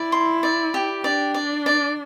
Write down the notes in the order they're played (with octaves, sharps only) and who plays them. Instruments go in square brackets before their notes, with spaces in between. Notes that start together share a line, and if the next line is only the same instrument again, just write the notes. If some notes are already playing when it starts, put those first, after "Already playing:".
Already playing: [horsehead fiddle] E4 [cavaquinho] D5
[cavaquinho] C6
D5
G4
[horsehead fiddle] D4 [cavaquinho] D5
[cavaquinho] D5
D5